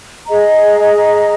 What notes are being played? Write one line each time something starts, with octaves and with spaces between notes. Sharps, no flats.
G#4 D#5 A#5